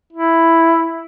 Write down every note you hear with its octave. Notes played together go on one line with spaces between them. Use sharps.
E4